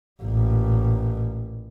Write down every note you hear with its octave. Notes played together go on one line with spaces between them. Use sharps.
A1 A#2